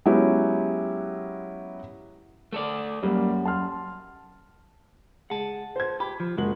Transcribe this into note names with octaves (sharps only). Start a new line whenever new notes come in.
F#3 G#3 B3 C#4 E4 G4
A3 A4 D5
F#2 G3 A#3
A5 C6 F6
G#3 F#5 A5
C5 G#6
G4 B5
F3
F#1 G#3 F#4 F#7